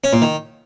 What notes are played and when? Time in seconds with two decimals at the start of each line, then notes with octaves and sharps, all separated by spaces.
0.04 C#4
0.13 A#2
0.22 D#3